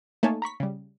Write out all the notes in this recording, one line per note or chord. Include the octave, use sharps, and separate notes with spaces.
A3 A#3 D#4 C#5 G#5 A5
A#5 B5 C#6 B6
C#3 G3